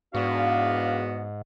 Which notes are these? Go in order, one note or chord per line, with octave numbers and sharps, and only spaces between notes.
E2 G#2 B3 D4 F#4 D5 F5